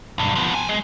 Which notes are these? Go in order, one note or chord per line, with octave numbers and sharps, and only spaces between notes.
B1 G2
F3 B3
G5 G#5
G#3